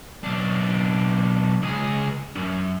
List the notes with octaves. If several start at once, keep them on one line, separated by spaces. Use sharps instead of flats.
B1 D4
C#2 G#4
F#2